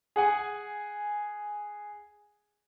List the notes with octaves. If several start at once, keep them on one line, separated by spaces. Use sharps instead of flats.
G#4 F#5 G#5